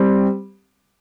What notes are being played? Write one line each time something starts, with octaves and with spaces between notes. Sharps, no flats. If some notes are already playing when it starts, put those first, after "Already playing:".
Already playing: G3 C4